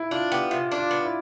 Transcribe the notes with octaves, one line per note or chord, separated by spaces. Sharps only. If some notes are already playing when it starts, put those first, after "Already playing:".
Already playing: E4
D4 F4
B3 G4
C3 F4
D4
F4
B3
E4